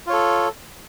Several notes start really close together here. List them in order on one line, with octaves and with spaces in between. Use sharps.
F4 C#5 A4